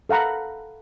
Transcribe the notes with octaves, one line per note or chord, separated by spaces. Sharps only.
A4 F5 F#5 A#5 B5